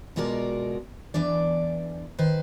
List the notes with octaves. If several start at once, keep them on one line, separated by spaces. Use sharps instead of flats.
B2 G#3 F4 F#4 A#4 D5
E2 E3 D4 D5
D#3 B4 C5